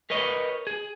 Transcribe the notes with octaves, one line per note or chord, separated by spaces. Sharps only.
A#4 B4 C#5 D#5
G#4